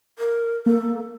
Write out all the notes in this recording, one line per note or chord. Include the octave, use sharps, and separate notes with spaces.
A#4
A#3 A4